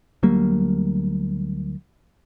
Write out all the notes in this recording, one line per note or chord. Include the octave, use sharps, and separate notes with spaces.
D2 F#3 G3 A#3